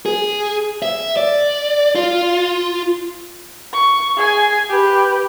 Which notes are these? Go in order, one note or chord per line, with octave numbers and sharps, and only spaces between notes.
G#4
E5
D5
F4
C#6
G#4 G#5
G4 B4